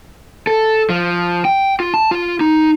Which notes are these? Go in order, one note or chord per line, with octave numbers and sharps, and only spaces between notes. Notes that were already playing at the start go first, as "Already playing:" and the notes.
A4
F3
G5
F4
A5
F4
D#4